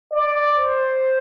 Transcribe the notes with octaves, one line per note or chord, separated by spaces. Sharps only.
D5
C5